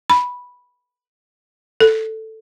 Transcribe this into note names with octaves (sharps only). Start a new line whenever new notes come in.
B5
A4